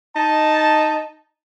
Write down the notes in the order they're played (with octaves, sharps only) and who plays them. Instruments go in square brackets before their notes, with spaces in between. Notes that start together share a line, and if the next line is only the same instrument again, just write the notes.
[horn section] D#4 A5